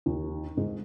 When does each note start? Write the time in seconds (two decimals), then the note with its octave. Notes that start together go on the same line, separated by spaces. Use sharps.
0.06 D#2
0.57 G#2